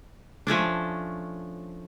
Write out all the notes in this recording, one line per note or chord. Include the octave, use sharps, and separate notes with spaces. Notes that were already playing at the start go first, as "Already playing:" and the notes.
F3 A3 C#4 D4